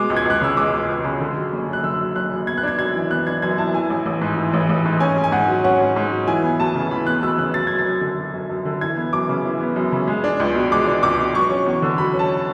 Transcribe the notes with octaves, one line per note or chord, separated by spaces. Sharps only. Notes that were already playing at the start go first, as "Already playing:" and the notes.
Already playing: B2 G#3 D6
C#2
G#6
C#2 F#6
C#3 E6
G#3 D6
C#2
C#2
C#3
D3
F#3
F#1
F#2
F#6
D3 E6
F#3
F#1 F#6
F#2
B3 G#6
F#6
D4 G#6
F#2 G#6
E3
B3 F#6
D4 G#6
F#2 G#6
E3 A5
E3 G#5
A1
A1
G#2
E3
A1
A1
G#2
C#4 G#5
G#2
G#5
G#2 F#5
F#3
C#4 F#5
G#2
G#2
F#3
E3 G#5
B3
D2 A5
C#3
E3 B5
B3 F#6
D2 E6
C#3 F#6
F#3 A6
F#2 G#6
A6
F#2
D3
F#3
F#2
F#2
D3
E3 G#6
B3
F#2 D6
C#3
E3
B3
F#2
C#3
G#3
D4
C#2
B2
G#3 D6
D4
C#2 D6
B2
F#3 C#6
C#4
E2
D3
F#3 B5
C#4
A5